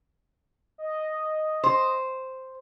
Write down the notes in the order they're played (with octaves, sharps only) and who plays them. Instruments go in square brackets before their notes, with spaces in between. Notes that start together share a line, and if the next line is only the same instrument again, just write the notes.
[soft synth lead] D#5
[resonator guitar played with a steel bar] C5